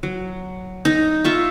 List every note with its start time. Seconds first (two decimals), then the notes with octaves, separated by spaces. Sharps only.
0.03 F#3
0.85 D#4
1.24 F4 E5 C#6